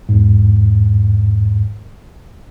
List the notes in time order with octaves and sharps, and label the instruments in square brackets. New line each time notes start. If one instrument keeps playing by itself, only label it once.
[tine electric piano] E2 G#2